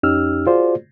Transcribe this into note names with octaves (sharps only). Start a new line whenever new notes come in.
F2 C#4 D#4 G4 E6 F6
F4 F#4 G#4 C5 D5